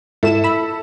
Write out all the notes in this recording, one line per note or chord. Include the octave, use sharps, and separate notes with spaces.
G#2 E4 A4 E7
B5 E6